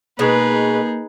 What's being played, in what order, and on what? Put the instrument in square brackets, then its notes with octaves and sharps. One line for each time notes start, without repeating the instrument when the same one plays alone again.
[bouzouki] B2 G#3 [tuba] A#3 [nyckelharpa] D#4 G#4 [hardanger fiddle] B4